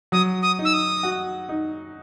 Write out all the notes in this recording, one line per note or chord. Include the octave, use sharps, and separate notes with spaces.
F#3 D#6
D#6
D#4
E6
D#6
F#4
D#4